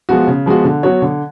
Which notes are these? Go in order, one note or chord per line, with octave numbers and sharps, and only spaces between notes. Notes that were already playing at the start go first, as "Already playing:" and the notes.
F3 G#3 B3 F#4
C#3
F3 G#3 B3 F#4
D3
F#3 B3 F#4 C#5
D3